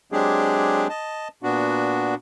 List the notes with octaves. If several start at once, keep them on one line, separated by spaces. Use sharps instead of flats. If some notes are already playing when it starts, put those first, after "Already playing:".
F#3 G#3 C4 D4 G4 G#4
D#5 A5
A#2 B3 D4 F#4